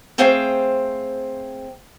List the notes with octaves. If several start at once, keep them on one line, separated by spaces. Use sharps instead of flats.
A3 C4 G#4 C5 F5 G5